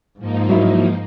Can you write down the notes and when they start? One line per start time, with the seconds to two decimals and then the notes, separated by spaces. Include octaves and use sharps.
0.19 G#2 F3 A#3 D#4
0.49 F#3 E4